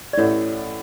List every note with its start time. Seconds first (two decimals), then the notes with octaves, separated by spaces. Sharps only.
0.13 D5
0.17 A1 A2 E3 A3 C#5